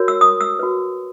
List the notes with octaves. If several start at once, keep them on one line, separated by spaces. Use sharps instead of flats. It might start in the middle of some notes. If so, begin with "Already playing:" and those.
Already playing: F#4 A#4 C#5
E6
D#6
E6
F#4 B4